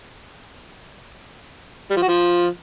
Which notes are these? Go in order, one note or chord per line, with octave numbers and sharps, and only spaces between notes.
G3
F3
F#4
F3